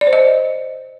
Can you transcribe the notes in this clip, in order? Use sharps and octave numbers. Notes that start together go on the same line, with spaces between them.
D5
C5
D#5